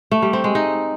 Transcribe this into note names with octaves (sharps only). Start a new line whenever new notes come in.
A3
G3
C4
G#3
D#4